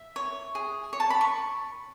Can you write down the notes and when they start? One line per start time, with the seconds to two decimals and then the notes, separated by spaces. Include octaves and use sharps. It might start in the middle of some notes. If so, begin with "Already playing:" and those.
Already playing: E5
0.16 C#5
0.55 G#4
0.93 C#5
1.00 A5
1.10 B5
1.21 C#6